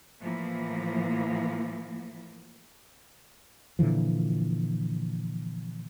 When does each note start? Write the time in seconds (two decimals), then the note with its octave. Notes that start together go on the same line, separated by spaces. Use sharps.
0.22 A2 E3 F3 A#3
3.79 A#2 D3 E3 F3